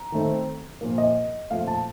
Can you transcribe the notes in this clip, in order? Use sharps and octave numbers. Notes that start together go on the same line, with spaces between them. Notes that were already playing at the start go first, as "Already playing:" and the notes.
Already playing: A#5
D#3 A3 C4
A#2 F3 A#3
D#5
A#2 F3 A3 F5
A5